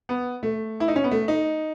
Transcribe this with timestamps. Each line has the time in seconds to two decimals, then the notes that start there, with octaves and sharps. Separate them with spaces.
0.09 B3
0.43 A3
0.80 E4
0.88 D#4
0.96 C#4
1.04 B3
1.11 A3
1.28 D#4